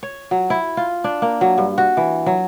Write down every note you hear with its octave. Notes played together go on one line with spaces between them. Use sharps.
C#5
F#3
E4
F4
D4
A#3
F#3
G2
F#4
E3
F#3